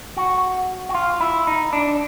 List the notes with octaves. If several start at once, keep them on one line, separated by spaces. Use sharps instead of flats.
F#4
F#4
F4
E4
D#4
D4